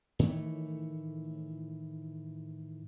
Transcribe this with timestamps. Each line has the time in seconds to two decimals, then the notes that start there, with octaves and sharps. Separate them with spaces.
0.19 A2 D#3 E3 A3